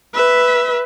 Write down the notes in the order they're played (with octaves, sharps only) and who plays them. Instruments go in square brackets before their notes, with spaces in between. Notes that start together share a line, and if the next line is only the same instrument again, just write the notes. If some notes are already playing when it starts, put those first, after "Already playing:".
[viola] B4 E5